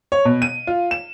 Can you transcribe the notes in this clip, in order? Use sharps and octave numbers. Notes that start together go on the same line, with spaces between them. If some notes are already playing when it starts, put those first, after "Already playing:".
C#5
B2
D#7
F4
E7